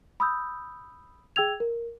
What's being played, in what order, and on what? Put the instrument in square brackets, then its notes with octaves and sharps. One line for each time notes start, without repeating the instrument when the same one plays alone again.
[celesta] B5 D#6 E6 G6
G#4 G5 E6 G#6 F7
A#4